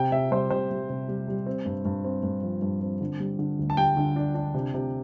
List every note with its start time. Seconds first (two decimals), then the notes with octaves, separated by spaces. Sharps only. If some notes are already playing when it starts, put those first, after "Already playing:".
Already playing: C3 G5
0.12 C3 E5
0.31 G3 C5
0.50 C3 C5
0.71 G3
0.90 C3
1.08 G3
1.28 G3
1.46 C4
1.65 G2
1.85 G2
2.04 C4
2.23 G2
2.43 F3
2.62 G2
2.81 C4
3.01 D3
3.20 G3
3.39 D3
3.59 D2
3.70 A5
3.77 G3 G5
3.97 D3
4.16 D4
4.35 D4
4.54 C3
4.74 C3